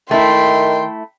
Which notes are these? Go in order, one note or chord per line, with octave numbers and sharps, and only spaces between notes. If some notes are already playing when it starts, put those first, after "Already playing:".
D#3 A3 E4 G5 C6